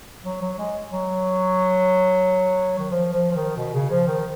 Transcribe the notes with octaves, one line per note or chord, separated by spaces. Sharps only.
F#3
F#3
G#3
F#3
D#3
F3
F3
F3
D#3
B2
C#3
F3
D#3